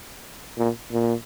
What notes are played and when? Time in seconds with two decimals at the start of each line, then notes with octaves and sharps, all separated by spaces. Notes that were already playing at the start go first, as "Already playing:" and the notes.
0.58 A#2
0.92 A#2